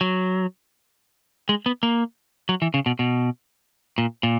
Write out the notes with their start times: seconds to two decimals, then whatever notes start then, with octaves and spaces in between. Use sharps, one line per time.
0.01 F#3
1.49 G#3
1.66 B3
1.83 A#3
2.49 F#3
2.62 E3
2.74 C#3
2.86 B2
2.99 B2
3.98 A#2
4.23 A#2